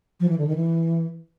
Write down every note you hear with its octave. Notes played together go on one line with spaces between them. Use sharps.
F3
E3
D3
D#3
E3